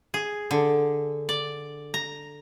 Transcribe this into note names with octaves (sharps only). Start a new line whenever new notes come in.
G#4
D3
D5
A#5